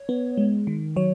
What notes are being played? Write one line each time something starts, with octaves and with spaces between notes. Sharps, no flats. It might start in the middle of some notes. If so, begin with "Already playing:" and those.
Already playing: C#5
B3
G#3
D#3
F#3 C#5